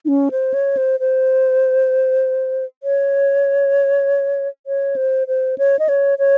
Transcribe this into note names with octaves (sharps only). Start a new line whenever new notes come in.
D#4
C#4
C5
C#5
C5
C5
C#5
C#5
C5
C5
C#5
D#5
C#5
C#5